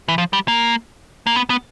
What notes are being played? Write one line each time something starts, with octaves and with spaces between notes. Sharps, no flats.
E3
F3
G3
A#3
A#3
B3
B3